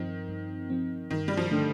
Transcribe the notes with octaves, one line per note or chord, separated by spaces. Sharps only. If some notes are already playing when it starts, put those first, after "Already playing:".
Already playing: G2 D#3 F3 C4
G2
F3 C4
G2 D#3
G3
F3
D3 A3 D4 A4